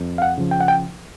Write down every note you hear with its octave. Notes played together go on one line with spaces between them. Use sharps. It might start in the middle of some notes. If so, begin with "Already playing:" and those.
Already playing: F2
F5
F#5
C#3 F3
G5
F#5
G5